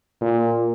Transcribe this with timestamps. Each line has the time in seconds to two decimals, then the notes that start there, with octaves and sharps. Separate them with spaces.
0.21 A#2